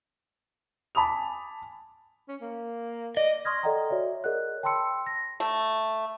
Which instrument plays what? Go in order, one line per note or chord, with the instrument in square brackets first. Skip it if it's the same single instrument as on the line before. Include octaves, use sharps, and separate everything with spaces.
[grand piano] G#5 A5 B5 D6 D#6 F7
[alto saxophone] C#4
A#3
[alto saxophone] D5 [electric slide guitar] D#5
[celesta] C6 C#6 D#6 F6 G#6 A#6
A4 D5 D#5 F#5 G5 A#5
F#4 C#5 D5 E5
G#4 A#4 C#5 D#5 F#5 F#6
G5 A5 B5 C6 E6 C#7
A#6
[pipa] A3